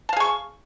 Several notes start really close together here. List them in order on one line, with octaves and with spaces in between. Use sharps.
A5 F5 G#4 C#6